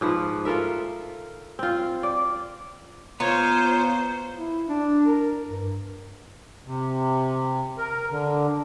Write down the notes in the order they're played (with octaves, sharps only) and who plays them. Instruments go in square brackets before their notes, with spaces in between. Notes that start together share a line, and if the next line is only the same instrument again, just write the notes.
[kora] G#2 F3 B4
F4 A4 A#4 E5
C4 F4
D5
[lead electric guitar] B3 C#5 [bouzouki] F4 [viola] C5 [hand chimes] A#5
[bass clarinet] E4
D4
A#4
G2
[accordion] C3
A#4
D3